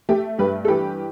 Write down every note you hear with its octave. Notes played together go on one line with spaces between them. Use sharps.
A3 G4
G2 G4 B4
A4
E3 G4 B4